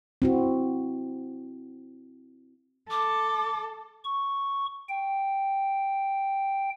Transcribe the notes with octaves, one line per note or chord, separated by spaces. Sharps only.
C4 E4 F#4
A4 D6
C#6
G5